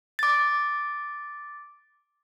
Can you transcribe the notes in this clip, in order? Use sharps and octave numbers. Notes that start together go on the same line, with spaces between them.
D6 A6